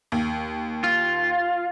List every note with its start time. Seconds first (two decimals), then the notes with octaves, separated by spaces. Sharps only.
0.12 D#2
0.84 F4